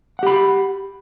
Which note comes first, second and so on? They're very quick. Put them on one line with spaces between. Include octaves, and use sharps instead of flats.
F#5 G4 B5